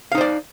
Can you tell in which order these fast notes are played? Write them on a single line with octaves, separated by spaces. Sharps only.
F5 D#4 C5 D5